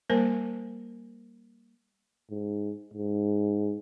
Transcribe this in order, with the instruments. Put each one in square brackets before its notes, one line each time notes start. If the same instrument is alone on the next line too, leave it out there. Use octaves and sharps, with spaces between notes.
[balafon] G3 A#3 A#4 C5 G#5
[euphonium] G#2
G#2